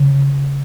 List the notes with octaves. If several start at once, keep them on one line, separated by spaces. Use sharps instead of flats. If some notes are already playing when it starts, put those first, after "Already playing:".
Already playing: C#3